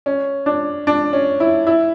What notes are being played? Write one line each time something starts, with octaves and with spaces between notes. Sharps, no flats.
C#4
D4
D4
C#4
E4
E4